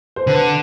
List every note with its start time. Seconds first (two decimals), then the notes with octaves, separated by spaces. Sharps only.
0.16 C5
0.27 D3 B4